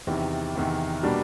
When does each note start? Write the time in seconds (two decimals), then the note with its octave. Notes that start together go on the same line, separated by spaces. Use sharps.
0.07 E2 C3 D#3
0.55 E2 C3 D#3
1.03 B2 G3 A#3 D4